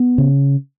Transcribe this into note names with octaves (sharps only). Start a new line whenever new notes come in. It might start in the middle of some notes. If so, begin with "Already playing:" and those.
Already playing: B3
C#3